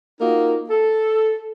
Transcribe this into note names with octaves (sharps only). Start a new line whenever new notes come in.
A#3 D#4 F4 F#4 A#4
A4